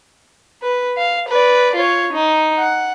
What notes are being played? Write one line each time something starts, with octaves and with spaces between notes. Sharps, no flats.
B4
F5
B4 D5
F4 C#5
D#4
F#5